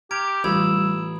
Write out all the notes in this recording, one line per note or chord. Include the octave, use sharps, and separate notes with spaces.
G4 A#5 F6 G#6 D7
A1 G3 F4 B5 D#6 E6 G#6